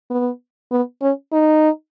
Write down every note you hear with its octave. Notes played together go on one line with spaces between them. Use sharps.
B3
B3
C#4
D#4